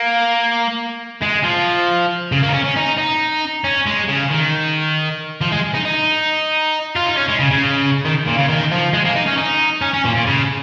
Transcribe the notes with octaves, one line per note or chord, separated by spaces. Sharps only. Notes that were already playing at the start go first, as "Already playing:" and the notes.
Already playing: A#3
G#3
F3
C#3
A#3
D#4
C#4
C#4
D#4
D#4
C#4
G#3
C#3
D#3
F3
G#3
D#4
D#4
F4
D#4
C#4
G#3
C#3
C#3
D#3
A#2
C#3
D#3
F3
G#3
A#3
D#4
C#4
D#4
C#4
C#4
A#2
A#2
C#3